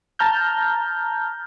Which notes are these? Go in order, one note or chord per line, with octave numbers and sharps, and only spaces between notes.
A5 A#5 F6 G6